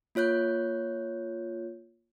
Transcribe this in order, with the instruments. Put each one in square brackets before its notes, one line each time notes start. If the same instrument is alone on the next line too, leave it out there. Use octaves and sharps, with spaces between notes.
[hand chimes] A#3 F4 C#5 F#6 G6